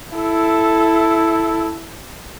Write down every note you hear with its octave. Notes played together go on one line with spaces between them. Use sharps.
E4 A4